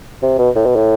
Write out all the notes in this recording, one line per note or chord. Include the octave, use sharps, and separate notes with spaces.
C3
B2
A2
B2
A2